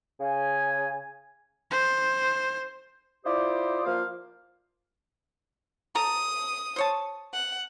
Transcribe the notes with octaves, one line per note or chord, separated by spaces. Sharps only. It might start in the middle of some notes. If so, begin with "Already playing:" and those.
C#3 G#5
C5
E4 F4 G4 C5 D5 D#5
F3 A#3 F4 C5 F5
A4 A#5 D#6
C5 C#5 A5
F#5